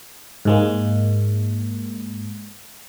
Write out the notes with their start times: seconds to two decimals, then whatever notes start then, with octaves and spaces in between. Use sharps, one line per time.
0.45 G#2 G#3 A#3